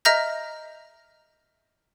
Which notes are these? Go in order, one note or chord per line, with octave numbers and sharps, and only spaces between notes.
D#5 E5 A#5 F6 G6 A#6